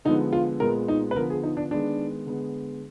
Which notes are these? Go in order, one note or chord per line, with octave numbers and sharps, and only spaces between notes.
D3 F3 G#3 B3 D#4
F4
A#2 G#3 B3 A#4
D#4
B4
D3 F3 B3 A#4
G#4
D#4
D4
D#3 G#3 B3 D4
D3 G#3 B3